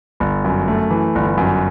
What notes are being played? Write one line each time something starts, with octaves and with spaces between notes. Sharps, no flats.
G1
F#2
A3
E3
G1
F#2